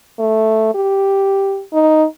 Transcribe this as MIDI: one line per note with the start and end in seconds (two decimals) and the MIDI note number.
0.19 0.73 57
0.74 1.62 67
1.73 2.05 63